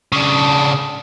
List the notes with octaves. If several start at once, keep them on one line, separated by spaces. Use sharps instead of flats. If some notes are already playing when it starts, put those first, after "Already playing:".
C#3 D4